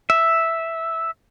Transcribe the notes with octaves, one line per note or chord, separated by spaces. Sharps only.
E5